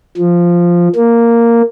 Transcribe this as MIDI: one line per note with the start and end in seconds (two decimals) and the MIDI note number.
0.17 0.88 53
0.96 1.62 58